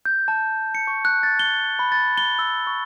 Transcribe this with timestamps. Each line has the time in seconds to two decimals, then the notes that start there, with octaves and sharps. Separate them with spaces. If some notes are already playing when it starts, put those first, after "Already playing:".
0.05 G6
0.28 A5
0.75 C#7
0.87 C#6
1.05 F#6
1.23 A6
1.39 G7
1.79 B5
1.92 A6
2.18 G7
2.39 E6
2.67 C#6